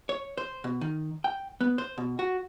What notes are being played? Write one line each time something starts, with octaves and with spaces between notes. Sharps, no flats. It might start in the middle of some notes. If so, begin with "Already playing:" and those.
C#5
C5
B2
D#3
G5
B3
C5
B2
F#4